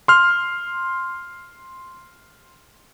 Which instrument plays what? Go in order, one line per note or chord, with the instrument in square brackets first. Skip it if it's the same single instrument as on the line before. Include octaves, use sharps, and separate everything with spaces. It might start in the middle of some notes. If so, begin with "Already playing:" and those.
[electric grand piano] C6 F6